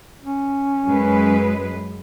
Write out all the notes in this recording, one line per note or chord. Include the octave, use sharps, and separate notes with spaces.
C#4
F#2 G#3 B4